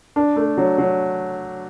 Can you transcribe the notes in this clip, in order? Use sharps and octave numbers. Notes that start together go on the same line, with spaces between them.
D4
A3
F#3
F#3